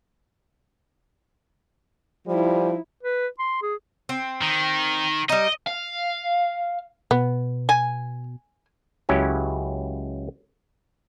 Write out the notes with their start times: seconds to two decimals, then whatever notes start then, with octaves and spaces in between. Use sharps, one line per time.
2.28 F3 G3 D#4 E4
3.03 B4
3.39 C6
3.62 G#4
4.09 C4
4.42 D#3
5.29 G3 D#4 D#5
5.67 F5
7.11 B2 B3
7.69 G#5
9.09 C#2 C#3 F#3 C#4 E4 G4